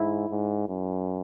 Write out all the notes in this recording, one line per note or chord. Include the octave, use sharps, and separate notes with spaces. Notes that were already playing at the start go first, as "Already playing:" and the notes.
Already playing: G#2 E4
G#2
F#2